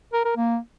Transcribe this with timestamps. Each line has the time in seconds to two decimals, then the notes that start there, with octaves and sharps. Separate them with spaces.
0.13 A#4
0.25 A#4
0.37 A#3